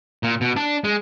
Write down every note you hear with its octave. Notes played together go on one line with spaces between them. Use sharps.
A#2
B2
D4
G#3